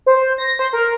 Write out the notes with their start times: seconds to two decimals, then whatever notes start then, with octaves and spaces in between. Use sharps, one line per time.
0.06 C5
0.38 A#6
0.59 C5
0.73 A#4